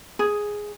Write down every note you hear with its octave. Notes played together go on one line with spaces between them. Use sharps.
G#4